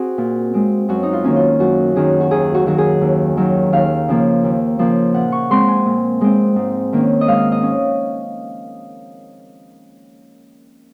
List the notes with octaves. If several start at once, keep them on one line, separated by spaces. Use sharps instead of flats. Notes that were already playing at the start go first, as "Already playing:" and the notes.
Already playing: C4 F#4 G#4
A#2
G#3 C4
F#2 F#4
D#4
F4
D#3 A#3 C#4
F4
F#2 F#4
D#3 A#3 C#4 G#4
F#4
D#2 G#4
F#4
D#3 F#3 F#4
G#4
D#2
D#3 F#3
D#2 F5
C#3 F3 A#3
D#2
C#3 F3 A#3
A#2 F#5
C#6
G#3 C4 C6
G#5
A#2
G#3 C4
G#2
D#3 A#3 C#4
D#5
G#2 F5
D#5
C#4